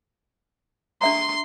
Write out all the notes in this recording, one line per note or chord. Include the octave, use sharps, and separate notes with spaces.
D4 E5 A#5 C6